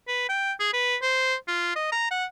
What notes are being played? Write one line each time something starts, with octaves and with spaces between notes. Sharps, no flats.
B4
G5
G#4
B4
C5
F4
D#5
A#5
F#5